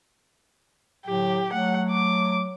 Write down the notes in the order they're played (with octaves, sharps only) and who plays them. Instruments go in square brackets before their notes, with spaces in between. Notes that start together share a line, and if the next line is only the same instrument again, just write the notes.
[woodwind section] A2 D3 F#3 [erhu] G4
[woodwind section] F#3 A3 [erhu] F#5
[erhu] D6